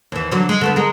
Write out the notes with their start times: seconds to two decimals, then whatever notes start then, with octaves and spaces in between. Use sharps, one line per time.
0.12 D#2 E3
0.32 D3 E3 F#3
0.49 G#3
0.61 D3 A3 B3
0.76 G#3 A#4